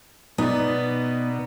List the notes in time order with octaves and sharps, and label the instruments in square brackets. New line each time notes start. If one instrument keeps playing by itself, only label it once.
[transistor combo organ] B2 [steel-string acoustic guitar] B3 [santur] D#4 D5